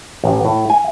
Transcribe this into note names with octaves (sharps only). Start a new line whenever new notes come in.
A1
A2
G#5